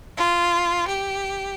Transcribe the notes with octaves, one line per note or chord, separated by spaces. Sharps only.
F4
G4